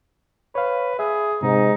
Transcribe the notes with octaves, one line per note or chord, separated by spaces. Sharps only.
B4 C#5 F5
G#4 E5
G#2 C3 D#4